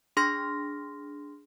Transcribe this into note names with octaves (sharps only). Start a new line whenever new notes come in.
D4 G#4 C6 F6 A#6